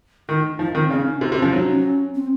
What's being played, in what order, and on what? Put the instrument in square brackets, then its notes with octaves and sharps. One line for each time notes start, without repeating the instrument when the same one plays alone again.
[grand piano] D#3 [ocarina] D#4
[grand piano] F3 [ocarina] D#4
[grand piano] D#3 [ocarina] C4
[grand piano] C#3 [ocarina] C#4
[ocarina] D#4
[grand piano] C3 [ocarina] C4
[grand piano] C3
[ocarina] C#4
[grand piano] F3
[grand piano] F#3 [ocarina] D#4
[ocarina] C#4
C4